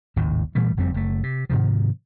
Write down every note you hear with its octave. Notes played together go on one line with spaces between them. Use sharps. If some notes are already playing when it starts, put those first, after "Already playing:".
G#1 D#2 A2 C#3
A#2 E3 G3 A3
F#1 F2 G3 C4
F#1 A3
C3
G#2 C3 D#3 F3